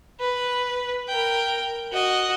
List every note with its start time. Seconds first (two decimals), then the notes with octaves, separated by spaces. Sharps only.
0.20 B4
1.08 A#4 G5
1.92 F#4 D#5